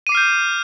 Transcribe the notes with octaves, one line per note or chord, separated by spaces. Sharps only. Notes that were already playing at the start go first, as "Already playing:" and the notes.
D6 F6 G6 C7 D#7